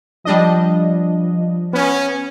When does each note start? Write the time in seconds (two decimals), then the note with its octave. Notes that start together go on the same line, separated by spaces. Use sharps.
0.25 F3 G3 D4 D#5
1.73 B3 C#4